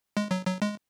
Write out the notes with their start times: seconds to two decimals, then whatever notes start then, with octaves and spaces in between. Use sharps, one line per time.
0.17 G#3
0.31 F#3
0.46 F#3
0.62 G#3